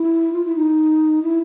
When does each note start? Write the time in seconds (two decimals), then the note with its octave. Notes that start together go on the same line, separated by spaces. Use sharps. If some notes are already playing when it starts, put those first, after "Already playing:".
Already playing: E4
0.33 F4
0.45 E4
0.55 D#4
1.23 E4